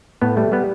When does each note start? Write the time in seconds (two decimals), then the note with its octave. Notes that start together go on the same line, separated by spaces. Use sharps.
0.21 A2 B3
0.37 G3 A3
0.52 G3 B3